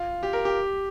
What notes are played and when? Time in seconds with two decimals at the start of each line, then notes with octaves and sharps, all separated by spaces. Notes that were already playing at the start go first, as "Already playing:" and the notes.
Already playing: F4
0.23 G4
0.33 A#4
0.45 G4